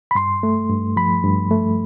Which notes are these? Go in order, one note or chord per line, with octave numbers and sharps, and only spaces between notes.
B5
G2 C6
A3
G2
F3 B5
G2
A3